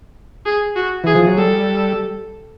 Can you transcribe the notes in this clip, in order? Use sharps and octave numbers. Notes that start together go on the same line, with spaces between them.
G#4
F#4
E3 G#4
F3
F#3
G3 A4